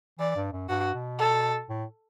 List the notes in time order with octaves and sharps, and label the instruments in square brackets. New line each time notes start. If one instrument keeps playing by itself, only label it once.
[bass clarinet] E3 [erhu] D5
[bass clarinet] G2
F#2
[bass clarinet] G2 [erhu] F#4
[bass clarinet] B2
[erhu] A4
[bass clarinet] A2